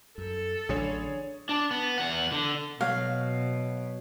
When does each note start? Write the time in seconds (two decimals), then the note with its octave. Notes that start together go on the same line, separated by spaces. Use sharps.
0.18 F#2 A4
0.69 A1 D3 F#3 D4 G#4 C#5 A6
1.49 D4
1.71 B3
1.98 E2 F#5
2.32 D3
2.81 B2 F#3 F5